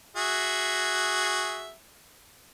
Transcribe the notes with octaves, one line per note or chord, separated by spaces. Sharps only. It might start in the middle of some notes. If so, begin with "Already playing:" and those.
F#4 G#4 E5